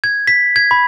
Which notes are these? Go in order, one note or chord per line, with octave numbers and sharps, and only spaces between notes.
G#6
B6
G#6
B5